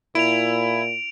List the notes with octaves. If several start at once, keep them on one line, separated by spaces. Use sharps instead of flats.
A#2 E4 D7 F7